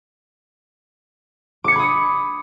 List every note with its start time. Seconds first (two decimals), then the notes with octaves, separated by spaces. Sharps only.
1.64 D6
1.68 C#7
1.72 G#6
1.76 B5
1.79 D#6